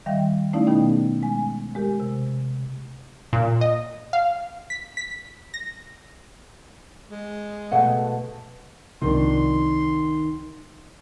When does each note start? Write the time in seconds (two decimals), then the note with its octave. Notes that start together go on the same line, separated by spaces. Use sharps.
0.06 D#3 G3 E5 F5 G5
0.53 A3 C#4 D#4 E4 D5 F5
0.67 B2 D#3 B3 D#4 G#4 G5
1.23 G#3 G#5
1.75 G#3 G4 A#4
2.00 C3
3.33 A#2
3.61 D#5
4.13 F5
4.70 B6
4.97 B6
5.54 A#6
7.09 G#3
7.72 B2 A3 F#5
9.02 C2 C3 D#3 F3 D4 C6